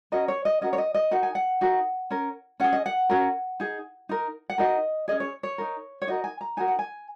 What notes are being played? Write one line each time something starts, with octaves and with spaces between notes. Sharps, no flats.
C#4 F#4 A#4 D#5
C#5
D#5
C#4 F#4 A#4 D#5
C#5
D#5
D#5
D#4 F#4 A#4 F#5
G#5
F#5
D#4 F#4 A#4
C#4 A#4
C#4 G#4 F#5
D#5
F#5
C#4 F#4 A#4
D#4 G#4
D#4 A#4
F#5
D#4 F#4 A#4 D#5
C#4 G#4 D#5
C#5
C#5
D#4 A#4
C#5
D#4 F#4 A#4 D#5
G#5
A#5
D#4 F#4 A#4 G#5
F#5
G#5